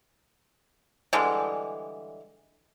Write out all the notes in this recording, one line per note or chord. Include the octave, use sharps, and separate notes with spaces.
D3 E3 G3 G#3